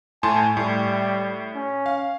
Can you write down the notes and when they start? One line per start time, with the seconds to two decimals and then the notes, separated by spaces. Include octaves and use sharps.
0.23 A2 G#5 A5 C6
0.57 A2 G3
1.55 C#4
1.86 F5